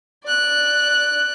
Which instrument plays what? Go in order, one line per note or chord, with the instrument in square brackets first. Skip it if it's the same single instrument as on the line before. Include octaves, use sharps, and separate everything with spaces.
[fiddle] D5 F#6